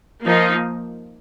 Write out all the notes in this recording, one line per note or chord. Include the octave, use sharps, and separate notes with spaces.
F3 A#3 D#4